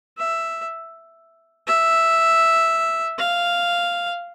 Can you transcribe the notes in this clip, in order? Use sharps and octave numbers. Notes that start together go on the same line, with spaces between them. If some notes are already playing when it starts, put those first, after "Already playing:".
E5
E5
F5